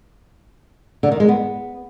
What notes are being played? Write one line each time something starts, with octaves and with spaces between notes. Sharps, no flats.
D3
D#3
G#3
B3